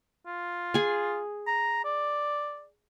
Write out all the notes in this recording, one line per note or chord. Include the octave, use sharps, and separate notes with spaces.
F4
G#4 G#5
A#5
D5